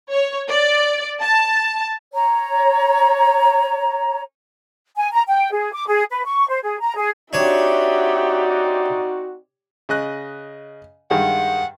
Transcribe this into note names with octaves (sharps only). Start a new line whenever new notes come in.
C#5
D5
A5
C#5 A#5
G#5
A#5
G5
G#4
D6
G#4
B4
C#6
C5
G#4
A#5
G#4
C4 D4 D#4 F#4 G4 C#5 D5 E5
C#3 D#5 F#6
G2 D#3 G#3 F#5